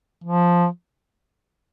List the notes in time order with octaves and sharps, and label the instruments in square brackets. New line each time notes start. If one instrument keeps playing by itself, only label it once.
[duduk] F3